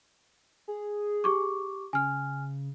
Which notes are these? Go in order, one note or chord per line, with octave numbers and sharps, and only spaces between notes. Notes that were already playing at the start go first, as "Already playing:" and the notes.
G#4
G4 C#6 D6
C#3 G#5 F6